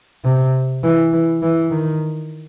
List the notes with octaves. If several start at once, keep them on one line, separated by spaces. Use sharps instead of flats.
C3
E3
E3
E3
D#3